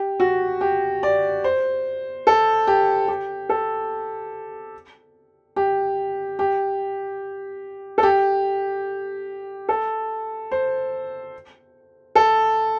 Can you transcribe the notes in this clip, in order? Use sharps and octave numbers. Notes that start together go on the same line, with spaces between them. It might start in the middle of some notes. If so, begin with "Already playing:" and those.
Already playing: G4
F#4
G4
D5
C5
A4
G4
G4
A4
G4
G4
A4
G4
A4
C5
A4